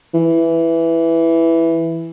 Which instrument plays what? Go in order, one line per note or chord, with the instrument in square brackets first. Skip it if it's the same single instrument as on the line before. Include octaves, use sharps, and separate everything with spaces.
[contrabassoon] E3